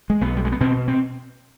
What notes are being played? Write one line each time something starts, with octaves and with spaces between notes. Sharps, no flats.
G#3
B1 B3
G3
G#3
B3
B2 C4
C4